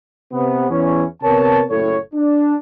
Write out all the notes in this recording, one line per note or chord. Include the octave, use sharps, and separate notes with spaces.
C3 B3
E2 E3 C#4
C3 B3 A#4 C#5 A5
F#1 A2 A4 C#5
D4